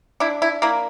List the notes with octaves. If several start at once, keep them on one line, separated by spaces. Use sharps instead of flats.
D4 E4
E4
A#3 E4